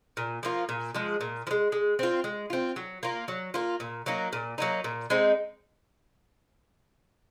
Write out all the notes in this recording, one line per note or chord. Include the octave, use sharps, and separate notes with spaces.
A#2
F3 A#3 F4
A#2
F3 G#3
A#2
F3
G#3
G#3
C4 F4
G#3
C4 F4
F#3
A#3 F4
F#3
A#3 F4
A#2
F#3 A#3 D#4
A#2
F#3 A#3 D#4
A#2
G#3 C4 D#4